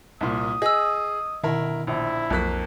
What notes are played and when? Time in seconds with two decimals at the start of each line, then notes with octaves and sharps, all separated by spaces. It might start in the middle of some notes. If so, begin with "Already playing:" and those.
0.21 C2 A#2 D#6
0.62 G#4 D#5 E6
1.43 B2 D3 D#3 E4 A#4
1.87 A#1 E4
2.30 B1 F2 F#3 A#3 F#6 B6